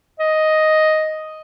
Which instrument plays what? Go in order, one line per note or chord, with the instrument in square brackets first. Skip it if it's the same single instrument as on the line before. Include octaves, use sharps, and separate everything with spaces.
[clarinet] D#5